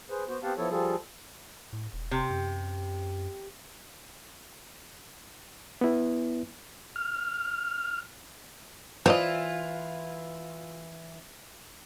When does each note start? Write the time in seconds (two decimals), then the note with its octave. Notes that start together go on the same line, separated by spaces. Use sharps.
0.10 G#4 B4 C5
0.28 B3 F#4 C5
0.43 B3 C4 G4 F5 F#5 A5
0.58 F3 B3 E4 A4 C#5
0.70 F3 G3 F4 G#4 A4
1.73 A2
1.93 E1
2.11 C3
2.30 F#2
5.81 B3 E4
6.96 F6
9.06 E3 F4 C5 D5 D#5